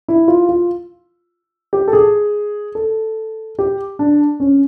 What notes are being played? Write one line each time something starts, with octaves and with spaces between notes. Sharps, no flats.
E4
F4
F4
G4
A4
G#4
A4
G4
D4
C#4